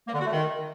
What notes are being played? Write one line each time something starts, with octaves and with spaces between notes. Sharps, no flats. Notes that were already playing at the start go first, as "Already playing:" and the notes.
A#3
D3
F#4
A3
D#3